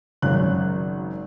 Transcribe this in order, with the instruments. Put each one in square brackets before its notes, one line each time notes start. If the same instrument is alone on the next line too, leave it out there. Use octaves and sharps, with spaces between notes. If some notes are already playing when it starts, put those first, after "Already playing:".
[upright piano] G#1 F#2 C#3 F#6